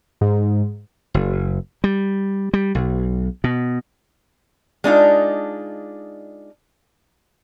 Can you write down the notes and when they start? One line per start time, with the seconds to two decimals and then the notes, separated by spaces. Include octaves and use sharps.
0.21 G#2
1.14 F#1
1.84 G3
2.54 G3
2.75 B1
3.44 B2
4.84 G#3 D4 D#4 F4